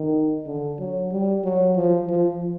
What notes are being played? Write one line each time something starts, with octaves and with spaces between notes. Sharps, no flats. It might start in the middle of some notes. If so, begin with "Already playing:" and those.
Already playing: D#3
D3
F#3
G3
F#3
F3
F3